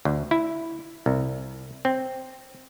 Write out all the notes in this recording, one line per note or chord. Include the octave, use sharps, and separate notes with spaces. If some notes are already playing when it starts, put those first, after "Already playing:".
D2
E4
C2
C4